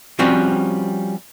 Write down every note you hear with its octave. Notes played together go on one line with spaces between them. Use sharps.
F3 G3 C4 C#4 F#4